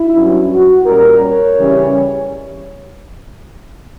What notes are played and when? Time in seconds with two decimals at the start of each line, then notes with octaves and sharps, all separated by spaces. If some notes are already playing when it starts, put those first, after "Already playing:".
Already playing: E4
0.14 G2 F#3 C#4
0.51 F#4
0.86 A#2 G3 C#4 A#4
1.22 C#5
1.58 C#3 E3 G3 C#4